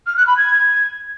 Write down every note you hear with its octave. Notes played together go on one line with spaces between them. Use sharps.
F6
F#6
B5
G#6